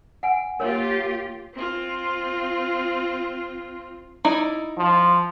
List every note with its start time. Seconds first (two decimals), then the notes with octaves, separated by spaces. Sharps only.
0.23 F#5 G#5
0.60 A#3 F4 G4 A#4 C#5 C6
1.54 C4 F4
4.25 D#4 E4 D5
4.78 F3